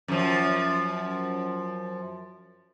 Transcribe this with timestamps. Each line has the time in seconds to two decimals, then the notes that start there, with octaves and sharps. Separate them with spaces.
0.08 F#2 F3